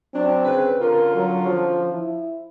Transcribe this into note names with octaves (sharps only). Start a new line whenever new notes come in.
F#3 C4 D4
C#3 B4
D3 C#4 F4 A#4
F#3
F3
E4